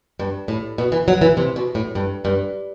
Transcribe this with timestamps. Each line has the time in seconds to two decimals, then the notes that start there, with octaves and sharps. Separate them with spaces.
0.19 G2
0.48 A2
0.78 B2
0.92 E3
1.08 F#3
1.21 E3
1.37 C3
1.56 B2
1.75 A2
1.95 G2
2.25 G2